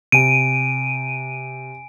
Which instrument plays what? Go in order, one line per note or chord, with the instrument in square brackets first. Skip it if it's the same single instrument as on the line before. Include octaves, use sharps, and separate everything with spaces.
[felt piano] C3 [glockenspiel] G#5 D7 [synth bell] D#7